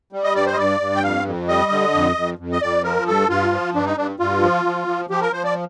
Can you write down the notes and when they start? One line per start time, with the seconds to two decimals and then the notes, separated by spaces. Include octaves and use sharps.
0.13 G3
0.24 D#5
0.35 G2 D5
0.47 C5
0.53 D#5
0.58 G2 D5
0.80 G2
0.96 G5
1.03 F2 F5
1.25 F2
1.49 G3 D#5
1.71 D3
1.94 F2
2.16 F2
2.38 F2
2.52 D#5
2.62 F2 D5
2.84 F3 A#4
3.07 G2 A4
3.29 G2 F4
3.52 F3
3.74 G2 D4
3.86 D#4
3.97 G2 D4
4.19 G2 F4
4.42 F3
4.65 F3
4.87 F3
5.10 F3 G4
5.22 A#4
5.33 F3 C5
5.44 D5